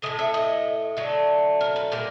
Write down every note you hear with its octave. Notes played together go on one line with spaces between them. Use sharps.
A2 F3 A3 D#5
E5
D#5
D3 F#3 A3
A#4
B4
A#2 G3 A#4